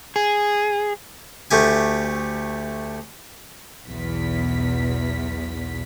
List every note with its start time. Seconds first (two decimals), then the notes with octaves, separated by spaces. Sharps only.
0.16 G#4
1.51 D2 A3 G4 G#5
3.86 B1 E2 B6